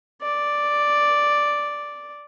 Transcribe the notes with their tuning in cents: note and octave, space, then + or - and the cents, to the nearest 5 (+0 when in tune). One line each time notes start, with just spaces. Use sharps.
D5 +0